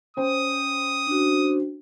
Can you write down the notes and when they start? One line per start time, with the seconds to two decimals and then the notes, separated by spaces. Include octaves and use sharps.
0.17 C#4 C5 G5 D#6
1.07 D4 F#4